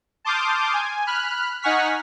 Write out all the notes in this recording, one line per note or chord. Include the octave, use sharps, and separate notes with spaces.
A5 C6 D6 D#6 F6 G6
G#5
B5 F6 F#6
D#4 F#5 G#5 C#6 F6 B6